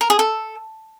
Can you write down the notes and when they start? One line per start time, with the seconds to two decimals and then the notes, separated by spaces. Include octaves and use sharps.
0.01 A#4
0.10 G#4
0.19 A4